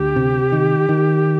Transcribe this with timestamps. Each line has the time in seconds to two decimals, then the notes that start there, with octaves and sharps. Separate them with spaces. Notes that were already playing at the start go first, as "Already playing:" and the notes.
Already playing: D2 G4
0.16 C3
0.52 D#3
0.89 D#3